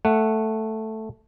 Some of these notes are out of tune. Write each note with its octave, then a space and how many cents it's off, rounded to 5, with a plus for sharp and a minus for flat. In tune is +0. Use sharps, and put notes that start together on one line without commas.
A3 +0 F#5 +0